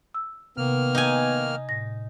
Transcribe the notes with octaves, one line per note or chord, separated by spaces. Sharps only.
E6
C3 D#3 A#3 B3 F6
D#4 G#5
A2 A#6